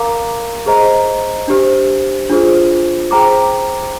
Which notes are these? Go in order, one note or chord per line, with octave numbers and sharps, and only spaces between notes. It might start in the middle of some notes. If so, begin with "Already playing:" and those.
Already playing: A#4 F5 A#5 D6
G#4 C5 D#5 A#5
D4 G4 C5
D4 F4 G#4 C5
G#4 C5 G5 A#5 D6